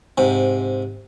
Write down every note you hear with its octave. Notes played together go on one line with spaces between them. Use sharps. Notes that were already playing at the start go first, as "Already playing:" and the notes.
G#2 C3